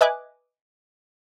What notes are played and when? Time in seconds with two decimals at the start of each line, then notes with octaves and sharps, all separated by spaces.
0.01 B4 D#5 E5 G#5 D6 F#6